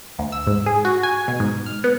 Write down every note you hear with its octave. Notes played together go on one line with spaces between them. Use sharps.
D2
E6
G#2
G#4
F#4
G#5
B2
G#2
F6
B3